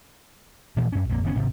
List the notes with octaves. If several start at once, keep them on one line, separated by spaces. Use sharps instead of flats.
A#2 E3 F3 A3
F#2 C#4
A#1 F2 G3 A#3
F#1 D#3 B3 C#4
D1 G#1 G#2 C3